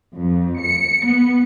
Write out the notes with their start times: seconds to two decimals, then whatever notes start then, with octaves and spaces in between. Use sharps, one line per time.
0.14 F2
0.59 C#7
1.05 B3